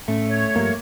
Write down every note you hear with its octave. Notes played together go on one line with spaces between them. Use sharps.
A2 A3 C#4
C#5
G2 F3 G3 A#3